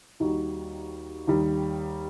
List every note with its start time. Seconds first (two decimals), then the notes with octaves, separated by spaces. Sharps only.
0.20 D#2 D#3 G3 D#4 F#4
1.27 D#2 D#3 G3